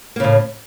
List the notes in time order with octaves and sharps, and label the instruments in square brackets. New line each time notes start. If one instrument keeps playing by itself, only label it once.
[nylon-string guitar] A#3
C#3
A2